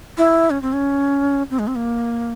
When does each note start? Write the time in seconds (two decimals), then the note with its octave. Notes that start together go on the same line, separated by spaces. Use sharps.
0.18 E4
0.50 C#4
0.62 C4
0.73 C#4
1.50 C4
1.59 G#3
1.67 C4
1.75 A#3